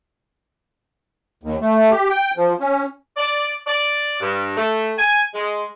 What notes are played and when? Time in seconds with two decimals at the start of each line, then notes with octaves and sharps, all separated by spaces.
1.43 D#2
1.61 A3
1.91 G4
2.10 G5
2.37 F3
2.60 C#4
3.16 D5
3.66 D5
4.20 G2
4.56 A3
4.97 G#5
5.34 G#3